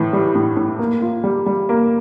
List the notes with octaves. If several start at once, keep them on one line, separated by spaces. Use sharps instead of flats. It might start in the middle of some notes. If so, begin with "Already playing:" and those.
Already playing: A2 E3
G3
A2
A2
A#3
F4
G3
G3
A#3